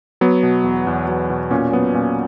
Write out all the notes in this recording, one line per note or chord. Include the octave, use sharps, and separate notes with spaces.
F#3 B3
B2
E2
E2
F#3
B2
A#2 C#4
F#3 B3
A#2 C#4